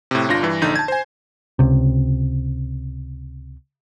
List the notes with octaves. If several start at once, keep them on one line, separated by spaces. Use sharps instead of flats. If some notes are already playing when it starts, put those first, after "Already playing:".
A2 C3
G1 D4 F4 A#6
G2 E3
A#1 D3 D#4 G6
A5 G#6
C5 G#5
C#2 C3